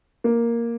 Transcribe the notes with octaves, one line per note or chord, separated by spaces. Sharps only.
A#3